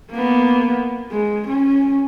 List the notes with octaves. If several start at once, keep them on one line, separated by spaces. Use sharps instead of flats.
A#3 B3
G#3
C#4